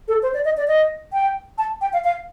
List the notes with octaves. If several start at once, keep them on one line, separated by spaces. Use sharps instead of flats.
A4
C5
D5
D#5
D5
D#5
G5
A5
G5
F5
F5